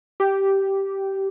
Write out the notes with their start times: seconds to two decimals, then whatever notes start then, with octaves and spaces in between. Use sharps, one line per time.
0.20 G4